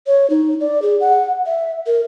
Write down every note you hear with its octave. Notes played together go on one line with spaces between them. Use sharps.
C#5
D#4
D5
G#4
F#5
E5
A#4